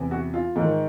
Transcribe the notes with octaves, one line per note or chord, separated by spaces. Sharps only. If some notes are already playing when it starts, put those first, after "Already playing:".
Already playing: E2 C3 E3
F#4
F4
G#2 D#3